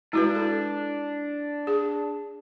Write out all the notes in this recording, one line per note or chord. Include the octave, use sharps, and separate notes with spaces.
G#3 D4 E4 F#4 B4
A4
G#4